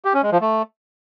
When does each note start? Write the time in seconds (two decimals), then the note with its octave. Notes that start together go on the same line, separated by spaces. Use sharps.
0.05 G4
0.14 C#4
0.23 G#3
0.32 F3
0.41 A3